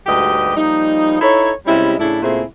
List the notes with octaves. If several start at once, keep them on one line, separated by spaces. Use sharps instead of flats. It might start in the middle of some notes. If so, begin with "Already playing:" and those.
D2 G#2 G3 G4 B4 D#5
F3 G3 A#3 D#4
D#4 E4 A4 B4 C#5
C3 G3 G#3 C#4 E4
A2 C#3 D4 E4
A#2 C#3 A3 C4 E4 G#4